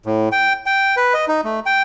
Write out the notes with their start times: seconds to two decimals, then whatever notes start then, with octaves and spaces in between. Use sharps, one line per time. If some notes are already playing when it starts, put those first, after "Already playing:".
0.06 A2
0.32 G5
0.66 G5
0.97 B4
1.14 D#5
1.28 D#4
1.44 A3
1.66 G5